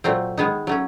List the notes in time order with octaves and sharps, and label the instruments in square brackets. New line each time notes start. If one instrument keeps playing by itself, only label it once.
[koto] A#2 F#3 A3 C4
D#3 G#3 B3 D#4
F#3 A3 C#4